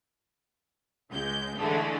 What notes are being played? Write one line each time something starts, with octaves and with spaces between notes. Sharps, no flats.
C#2 G#3 G6
D3 E3 G#3 A3